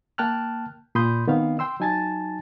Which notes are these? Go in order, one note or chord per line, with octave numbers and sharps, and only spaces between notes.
A#3 G5 A5 F6 F#6
A#2 B5 C6 D#6 G6
D#3 B3 C4 F5
G5 C6 E6
F#3 D#4 G#5 A5 A6